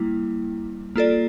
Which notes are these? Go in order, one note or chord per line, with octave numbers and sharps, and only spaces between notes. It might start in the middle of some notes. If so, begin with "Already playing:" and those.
Already playing: G3 A#3 E4
A#3 F4 A4 D5